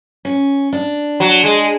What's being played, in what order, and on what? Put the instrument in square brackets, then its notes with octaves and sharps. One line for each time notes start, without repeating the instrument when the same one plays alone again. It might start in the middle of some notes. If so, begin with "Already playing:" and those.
[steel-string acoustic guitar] C#4
D4
[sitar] F#3
G#3